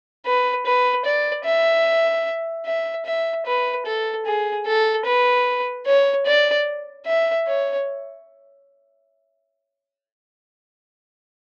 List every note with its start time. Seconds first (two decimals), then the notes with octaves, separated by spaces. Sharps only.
0.26 B4
0.66 B4
1.05 D5
1.45 E5
2.66 E5
3.05 E5
3.46 B4
3.86 A4
4.25 G#4
4.66 A4
5.06 B4
5.86 C#5
6.26 D5
7.06 E5
7.47 C#5